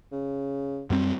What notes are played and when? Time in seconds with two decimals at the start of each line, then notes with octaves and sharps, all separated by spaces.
0.12 C#3
0.90 F#2 G3 C4